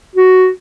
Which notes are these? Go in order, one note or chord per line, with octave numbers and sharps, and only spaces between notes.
F#4